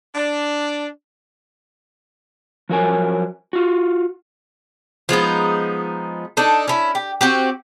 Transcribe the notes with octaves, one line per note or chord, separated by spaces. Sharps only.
D4
F3 F#3 A#4 G#5
F4 F#4
F3 G#3 B3 D#4
D4 D#4 A4
C#4 E4
G4
C4 F#4 G4